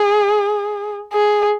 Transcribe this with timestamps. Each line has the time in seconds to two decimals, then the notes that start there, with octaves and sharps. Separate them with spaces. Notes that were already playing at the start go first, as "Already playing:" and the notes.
Already playing: G#4
1.13 G#4